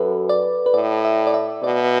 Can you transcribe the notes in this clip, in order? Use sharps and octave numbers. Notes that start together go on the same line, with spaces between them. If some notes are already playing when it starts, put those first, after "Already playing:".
Already playing: F#2 F#4 A4 B4
D5
B4
A2 D5
E5
D5
E5
B2 D5